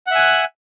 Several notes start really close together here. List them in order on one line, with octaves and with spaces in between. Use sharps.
F#5 E5 G#5 F#6